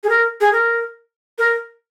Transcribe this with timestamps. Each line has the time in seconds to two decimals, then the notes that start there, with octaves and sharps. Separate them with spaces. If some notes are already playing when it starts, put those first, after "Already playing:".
0.04 G#4
0.09 A#4
0.41 G#4
0.53 A#4
1.38 A#4